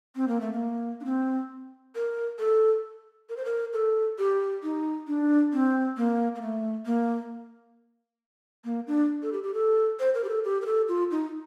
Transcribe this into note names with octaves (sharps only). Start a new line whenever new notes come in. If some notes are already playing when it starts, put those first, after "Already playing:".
C4
A#3
A3
A#3
D4
C4
A#4
A4
A#4
C5
A#4
A4
G4
D#4
D4
C4
A#3
A#3
A3
A#3
A#3
D4
A4
G4
G4
A4
C5
A#4
G4
A4
G4
A#4
A4
F4
D#4